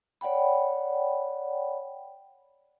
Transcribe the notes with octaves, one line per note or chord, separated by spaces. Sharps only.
C#5 D5 F#5 G5 B5